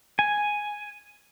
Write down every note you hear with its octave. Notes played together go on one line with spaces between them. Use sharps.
G#5